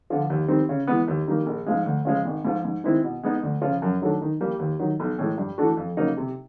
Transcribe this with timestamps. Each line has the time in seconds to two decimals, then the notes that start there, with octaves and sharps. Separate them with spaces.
0.10 D3 F3
0.30 D#2
0.48 D#3 G3 C4 D#4
0.69 C#3
0.87 E3 G#3 B3
1.08 D#2
1.28 D#3 G3 A#3
1.46 A#1
1.66 G#2 F3 G#3
1.86 D2
2.05 C#3 F3 G#3
2.25 G#1
2.45 G#2 F3
2.65 G#2
2.84 D#3 G#3 C4 E4
3.04 B2
3.23 G#3 B3 D#4
3.43 D2
3.62 C#3 F3
3.82 F#2
4.02 D#3 F#3 A3 D4
4.21 D#3
4.41 G3 A#3
4.59 D#2
4.79 D#3 F#3
5.00 B1
5.19 A2 E3 G#3
5.38 G2
5.58 E3 A3 D4 F#4
5.77 F2
5.97 C#3 F#3 A#3 D#4
6.17 C3